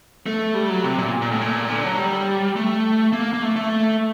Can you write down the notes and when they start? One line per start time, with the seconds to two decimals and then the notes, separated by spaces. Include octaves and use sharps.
0.26 A3
0.54 G3
0.70 F#3
0.83 C3
0.98 A#2
1.22 A#2
1.31 A2
1.41 A#2
1.69 D3
1.84 F#3
1.98 G3
2.56 A3
3.12 A#3
3.34 A#3
3.42 A3
3.56 A3